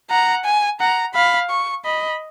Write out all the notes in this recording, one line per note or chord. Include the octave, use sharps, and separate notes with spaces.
F#5 A#5
G#5
F#5 A#5
F5 B5
C#6
D#5 B5